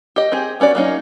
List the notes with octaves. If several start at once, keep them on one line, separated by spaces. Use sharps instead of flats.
G4 D#5
C4 G4 G#4
B3 C#4 F#4 D5
F#3 A#3 C#4 D#4